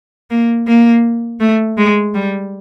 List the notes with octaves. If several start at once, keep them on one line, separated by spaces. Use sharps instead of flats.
A#3
A#3
A3
G#3
G3